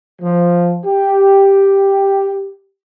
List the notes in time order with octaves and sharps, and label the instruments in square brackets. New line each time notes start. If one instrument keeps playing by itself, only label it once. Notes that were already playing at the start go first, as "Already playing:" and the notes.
[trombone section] F3
G4